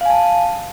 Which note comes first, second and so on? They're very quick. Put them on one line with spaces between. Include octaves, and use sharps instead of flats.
F5 G#5 A5